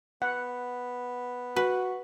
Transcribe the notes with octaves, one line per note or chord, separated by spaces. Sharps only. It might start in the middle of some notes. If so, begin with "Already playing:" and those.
B3 F#5
F#4 B4